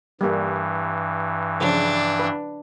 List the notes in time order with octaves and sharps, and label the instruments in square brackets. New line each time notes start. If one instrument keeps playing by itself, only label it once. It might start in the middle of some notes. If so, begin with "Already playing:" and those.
[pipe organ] G2 E3 [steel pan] G3 A#3 B4
[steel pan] C#3 F3 C#5 [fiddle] D4
[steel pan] B4